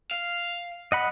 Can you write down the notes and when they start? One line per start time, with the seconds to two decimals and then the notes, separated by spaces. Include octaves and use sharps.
0.11 F5
0.92 D#5 F#5 B5